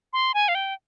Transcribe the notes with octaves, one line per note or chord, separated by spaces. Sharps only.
C6
G#5
F5
G5